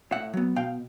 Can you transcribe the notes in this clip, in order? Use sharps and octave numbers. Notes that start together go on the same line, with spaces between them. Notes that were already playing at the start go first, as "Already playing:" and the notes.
A2 E5 F#5
F#3 B3
B2 F5 G5